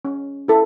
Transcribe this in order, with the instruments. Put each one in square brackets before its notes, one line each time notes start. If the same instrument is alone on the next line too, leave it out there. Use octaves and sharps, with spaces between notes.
[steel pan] C#4
E4 A4